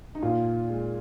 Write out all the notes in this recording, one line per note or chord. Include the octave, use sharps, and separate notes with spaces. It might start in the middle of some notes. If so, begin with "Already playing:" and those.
D#4
A#2 F4
G#3